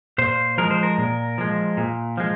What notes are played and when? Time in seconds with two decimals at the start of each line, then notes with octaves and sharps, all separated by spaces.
0.18 A#2 C5
0.58 F3 G#3 A#4
0.71 C5
0.83 A#4
0.98 A#2
1.38 F3 G#3
1.77 A#2
2.17 F3 G#3